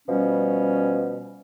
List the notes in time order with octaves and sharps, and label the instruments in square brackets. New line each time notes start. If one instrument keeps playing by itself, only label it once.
[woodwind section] B2 F3 G3 C#4